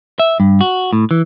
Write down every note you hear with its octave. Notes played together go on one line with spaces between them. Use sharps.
E5
G2
F#4
A2
E3